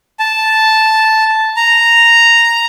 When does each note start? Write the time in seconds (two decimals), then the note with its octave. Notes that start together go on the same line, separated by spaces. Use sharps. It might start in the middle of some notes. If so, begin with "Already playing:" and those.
0.20 A5
1.57 A#5